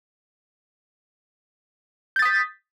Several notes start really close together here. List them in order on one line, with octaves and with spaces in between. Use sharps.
G6 A6 D#6 B6